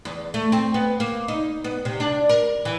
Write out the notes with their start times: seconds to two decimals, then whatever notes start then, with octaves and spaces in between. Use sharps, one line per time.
0.05 E2
0.34 A3
0.52 C4
0.74 B3
1.00 A#3
1.28 D#4
1.64 B3
1.85 C3
2.00 D4
2.29 A#4
2.65 E3